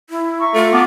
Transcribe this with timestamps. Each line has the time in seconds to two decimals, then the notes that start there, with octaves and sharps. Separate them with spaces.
0.10 E4
0.40 E5 A#5 C#6
0.54 A3 F4
0.73 B3 A5 D6